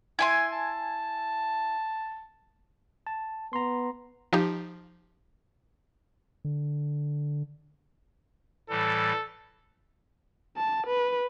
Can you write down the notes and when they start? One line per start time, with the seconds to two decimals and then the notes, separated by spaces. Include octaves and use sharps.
0.19 E4 G#5 C6
0.52 A5
3.07 A5
3.53 B3 A#5 C6
4.33 F3 D#4 G4
6.45 D3
8.70 A2 E3 G3 A4
10.57 A5
10.87 B4